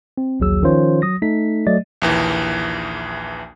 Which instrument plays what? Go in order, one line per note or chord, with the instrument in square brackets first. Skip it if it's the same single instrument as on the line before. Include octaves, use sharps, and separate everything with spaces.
[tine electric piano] C4
A#1 D#2 F#3 G#4 E6
D#3 F3 C#4 F4 C5 C#5
F#3 D#6 A#6
A3 D#4 A4 B6
F#3 A3 D5 D#5 A6
[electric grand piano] A#1 D#2 E3